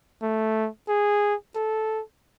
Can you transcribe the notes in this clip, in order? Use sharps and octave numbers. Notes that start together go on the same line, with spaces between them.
A3
G#4
A4